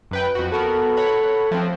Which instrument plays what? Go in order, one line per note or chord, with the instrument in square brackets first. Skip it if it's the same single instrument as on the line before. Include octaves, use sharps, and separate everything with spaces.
[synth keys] F#2 B4 G5
F2 F#4
[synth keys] B3 F#4 A#4 [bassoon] A4
[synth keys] C#5 F#5 B5
[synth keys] F3 C4 [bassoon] A3